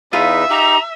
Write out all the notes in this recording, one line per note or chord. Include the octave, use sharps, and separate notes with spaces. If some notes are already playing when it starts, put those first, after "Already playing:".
E2 D#4 F4 G#4 B4 E5 F5
D#4 G4 A#5